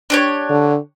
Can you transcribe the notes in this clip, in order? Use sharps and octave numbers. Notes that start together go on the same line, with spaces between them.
D4 G4 C#5
D3